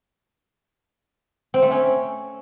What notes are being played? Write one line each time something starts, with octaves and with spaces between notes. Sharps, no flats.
C4
A3
C#4